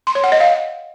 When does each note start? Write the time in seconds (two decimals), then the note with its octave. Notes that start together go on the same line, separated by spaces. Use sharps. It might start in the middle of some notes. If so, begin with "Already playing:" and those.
0.07 C6
0.15 C#5
0.24 F#5
0.32 D#5
0.40 F5